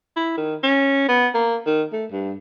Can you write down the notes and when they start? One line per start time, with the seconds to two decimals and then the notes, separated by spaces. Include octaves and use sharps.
0.16 E4
0.37 D#3
0.63 C#4
1.08 B3
1.34 A#3
1.66 D#3
1.93 A3
2.11 G2